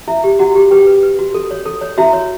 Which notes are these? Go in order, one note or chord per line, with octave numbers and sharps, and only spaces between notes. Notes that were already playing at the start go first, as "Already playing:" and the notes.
E4 E5
G4
E4 F#4 F#5
G4
G4 B4 G5
B4
B4
F#4
A4
C#5
A4
C#5
E4 F#4 E5
C#5